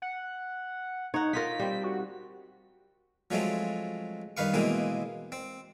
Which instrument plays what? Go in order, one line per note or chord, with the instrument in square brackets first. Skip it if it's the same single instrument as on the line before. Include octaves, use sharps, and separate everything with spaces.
[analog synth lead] F#5
[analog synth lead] D#4 [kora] C#5 F#5
[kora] D#4 F4 A#4 [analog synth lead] B6
[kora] G3 C4
[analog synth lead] F#4
[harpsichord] F3 F#3 G#3 A3 C4
G2 D#3 B4 F5 C#6
B2 E3 G#3 A#3 C4
C4